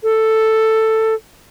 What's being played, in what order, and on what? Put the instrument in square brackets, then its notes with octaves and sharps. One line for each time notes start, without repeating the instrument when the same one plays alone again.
[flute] A4